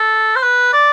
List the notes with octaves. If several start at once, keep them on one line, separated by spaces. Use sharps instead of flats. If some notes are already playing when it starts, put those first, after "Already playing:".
Already playing: A4
C5
B4
D5